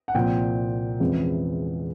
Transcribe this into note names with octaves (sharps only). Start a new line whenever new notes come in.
F#5
C2 A#2 F3 G5
E2 C3 F3 G#3 C#4